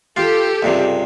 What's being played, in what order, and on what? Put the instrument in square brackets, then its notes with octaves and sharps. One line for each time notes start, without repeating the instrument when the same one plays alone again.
[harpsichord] F4 [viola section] G4 A4
[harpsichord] C#2 G2 C3